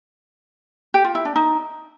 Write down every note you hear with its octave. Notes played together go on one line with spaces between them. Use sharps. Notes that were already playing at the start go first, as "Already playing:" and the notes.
G4
F4
E4
D4
D#4